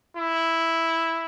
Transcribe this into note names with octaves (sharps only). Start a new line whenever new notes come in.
E4